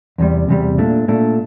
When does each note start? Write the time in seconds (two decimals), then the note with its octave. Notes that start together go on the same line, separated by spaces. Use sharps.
0.18 E2 C3 G3
0.48 E2 C3 G3
0.78 A#2 A3 D4
1.08 A#2 A3 D4